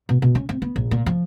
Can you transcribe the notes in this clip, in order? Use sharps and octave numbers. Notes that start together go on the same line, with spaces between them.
B2
B2
C#4
C4
B3
A#1
A#2
F3